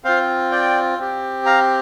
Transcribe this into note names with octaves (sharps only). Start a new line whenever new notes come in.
C4 F4 C5 F5
D5 G5
C4 G4
F5 A#5